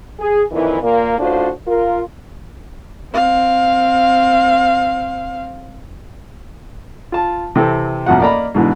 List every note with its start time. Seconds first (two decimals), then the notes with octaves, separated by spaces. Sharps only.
0.19 G#4
0.51 F2 A#2 D#3 E3
0.82 A#2 A#3
1.19 A2 C#3 D4 F4 F#4 C5
1.67 F4 A#4
3.13 C4 F5
7.12 F4 A5
7.56 C3 E3 C4 A4
8.06 A1 F2 B2 F3 F#4 F#5
8.20 A#3 A#4 D5 D#5 A#5 B5
8.55 G#2 B2 D3 E3